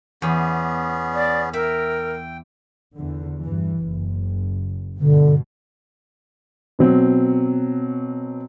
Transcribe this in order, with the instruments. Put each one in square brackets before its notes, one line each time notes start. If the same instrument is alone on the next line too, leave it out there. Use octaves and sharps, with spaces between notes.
[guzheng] E2 [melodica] B3 C#4 G#4
[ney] D5
[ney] A#4 [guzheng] E5 [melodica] G5
[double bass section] E2 D3
G2 E3
F#1
[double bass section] G2 B2 [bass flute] D3
[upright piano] B2 F#3 C4